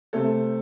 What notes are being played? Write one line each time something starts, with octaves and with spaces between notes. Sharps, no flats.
C3 A3 C4 A4